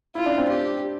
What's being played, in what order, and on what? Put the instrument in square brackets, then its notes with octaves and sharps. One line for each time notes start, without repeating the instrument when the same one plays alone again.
[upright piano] E4 [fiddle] F4
[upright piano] D4
C4
[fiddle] G4